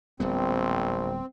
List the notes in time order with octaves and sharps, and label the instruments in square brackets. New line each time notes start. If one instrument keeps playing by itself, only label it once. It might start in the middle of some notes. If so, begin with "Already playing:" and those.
[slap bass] D1 G3 B3 [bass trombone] A#1 [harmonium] C4